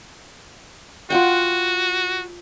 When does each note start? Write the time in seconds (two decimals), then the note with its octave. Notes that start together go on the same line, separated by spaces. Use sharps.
1.10 F4 F#4 F#5 G5